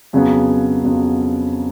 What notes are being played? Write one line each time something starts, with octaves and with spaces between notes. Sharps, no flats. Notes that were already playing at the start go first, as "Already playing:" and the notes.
F2 C#3 F#3 B3
F2 C#3 F#3 B3